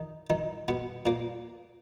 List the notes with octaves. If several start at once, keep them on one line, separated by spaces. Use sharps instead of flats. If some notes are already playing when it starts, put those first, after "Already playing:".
Already playing: D#3 D#4
D#3 D#4
B2 B3
A#2 A#3